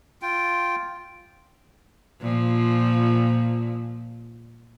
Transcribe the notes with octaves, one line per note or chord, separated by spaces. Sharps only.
F4 G5
A#2 F3